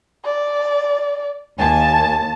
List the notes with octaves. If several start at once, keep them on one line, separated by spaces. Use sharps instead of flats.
D5
D#2 G#5 A5